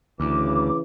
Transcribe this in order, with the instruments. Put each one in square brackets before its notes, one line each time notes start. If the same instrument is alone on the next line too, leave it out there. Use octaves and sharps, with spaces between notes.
[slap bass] D2 [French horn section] C#3 E3 [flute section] D6